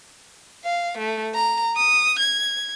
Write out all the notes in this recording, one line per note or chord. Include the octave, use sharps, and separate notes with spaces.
F5
A3
A#5
D#6
G#6